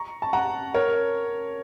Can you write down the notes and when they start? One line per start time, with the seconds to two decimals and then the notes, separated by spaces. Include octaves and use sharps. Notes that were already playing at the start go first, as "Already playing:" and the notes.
Already playing: A#5 C#6
0.22 A5
0.33 F#5 A#5
0.74 A#4 C#5